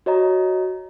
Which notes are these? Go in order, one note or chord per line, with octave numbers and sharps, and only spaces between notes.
F#4 C#5 D#5 A#5